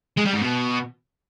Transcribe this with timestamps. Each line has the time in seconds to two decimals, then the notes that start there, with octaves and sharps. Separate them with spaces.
0.17 G#3
0.25 G3
0.33 G#2
0.41 B2